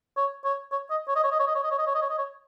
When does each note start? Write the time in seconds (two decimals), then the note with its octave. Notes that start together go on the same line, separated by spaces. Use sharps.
0.17 C#5
0.45 C#5
0.72 C#5
0.90 D#5
1.08 C#5
1.16 D#5
1.24 C#5
1.31 D#5
1.40 C#5
1.47 D#5
1.55 C#5
1.63 D#5
1.71 C#5
1.78 D#5
1.87 C#5
1.95 D#5
2.02 C#5
2.10 D#5
2.18 C#5